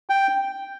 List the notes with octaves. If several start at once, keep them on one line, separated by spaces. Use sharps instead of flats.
G5